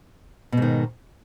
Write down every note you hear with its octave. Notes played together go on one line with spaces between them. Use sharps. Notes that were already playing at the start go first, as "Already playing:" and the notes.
G#2 B2 D#3